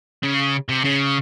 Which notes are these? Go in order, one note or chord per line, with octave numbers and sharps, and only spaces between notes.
C#3
C3
C#3